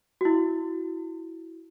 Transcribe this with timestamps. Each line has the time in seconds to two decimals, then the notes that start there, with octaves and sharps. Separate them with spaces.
0.21 E4 F#4